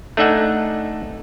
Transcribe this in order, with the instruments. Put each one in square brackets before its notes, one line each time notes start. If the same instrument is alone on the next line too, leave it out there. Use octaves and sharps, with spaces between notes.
[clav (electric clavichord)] A3 D4 D#4 E5 F#5 G#5